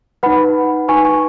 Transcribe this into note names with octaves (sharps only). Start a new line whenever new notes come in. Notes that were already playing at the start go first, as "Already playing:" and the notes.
D#4 B4 F#5 B5
D#4 B4 G#5 C#6
G#5 C#6